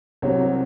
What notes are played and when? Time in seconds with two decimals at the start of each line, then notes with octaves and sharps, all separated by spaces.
0.22 C2 C3 F#3 C4 C#5